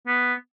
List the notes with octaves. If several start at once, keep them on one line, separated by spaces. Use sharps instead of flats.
B3